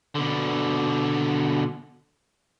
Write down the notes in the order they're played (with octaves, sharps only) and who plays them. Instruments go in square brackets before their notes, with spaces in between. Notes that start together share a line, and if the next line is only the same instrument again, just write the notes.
[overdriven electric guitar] B2 D3